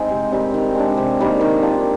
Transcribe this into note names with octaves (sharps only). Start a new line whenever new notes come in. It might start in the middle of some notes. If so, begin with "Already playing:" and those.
Already playing: G#3 C4 D#4
C3
D#3 G3 C4
D#3
G#3 D4
C3
D#3 G3 A#3
D#3
A#3 D4 F4